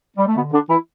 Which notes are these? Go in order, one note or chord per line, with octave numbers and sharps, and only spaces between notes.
G3
A3
B2 D3 B3
D3 D4
E3 E4